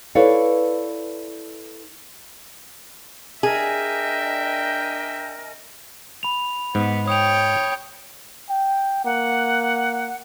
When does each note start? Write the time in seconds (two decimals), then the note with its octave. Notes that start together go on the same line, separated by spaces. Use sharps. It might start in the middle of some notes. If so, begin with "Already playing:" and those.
0.15 E4 A4 B4 C#5 D5 F5
3.43 D4 G#4 A#4 D#5 E5 G5 G#5
6.23 B5 F7
6.75 G#2 B3
7.08 C#5 G5 D#6 F7
8.49 G5
9.05 A#3 F#5